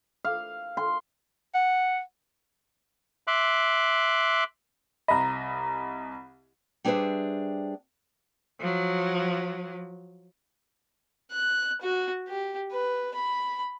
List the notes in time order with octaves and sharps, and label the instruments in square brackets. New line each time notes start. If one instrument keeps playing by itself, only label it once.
[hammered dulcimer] F5
C6
[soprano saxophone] F#5
[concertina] E5 C6 D6 F#6
[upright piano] C2 D#5 [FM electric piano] A#5 B5
[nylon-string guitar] G3 D4 G#4 B4 C5 E5
[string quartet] F3 F#3
[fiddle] F#6
F#4
G4
B4
B5